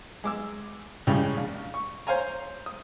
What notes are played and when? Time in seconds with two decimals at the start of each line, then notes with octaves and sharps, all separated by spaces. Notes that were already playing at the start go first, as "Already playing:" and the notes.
0.24 G#3 D6 E6
1.07 A2 C#3 G3 G#3
1.37 A#1
1.74 C#6
2.07 C5 C#5 F5 G#5 A#5
2.66 D#6